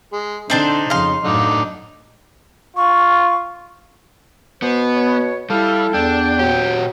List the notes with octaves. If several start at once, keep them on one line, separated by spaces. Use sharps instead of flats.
G#3
D3 C4 D4 D#4 C5
F2 C#3 F5 C6
F#2 A2 D3 D#4 D6
F4 C#6
B2 B3 C5
C#5
G3 E4 A4 F5
E2 D4 G5
A#2 F#3 G4